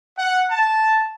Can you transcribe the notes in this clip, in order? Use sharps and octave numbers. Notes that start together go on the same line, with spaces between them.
F#5
A5